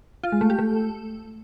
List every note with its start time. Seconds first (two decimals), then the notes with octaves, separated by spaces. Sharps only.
0.24 F4
0.32 G#3
0.41 A3
0.50 G4
0.59 A3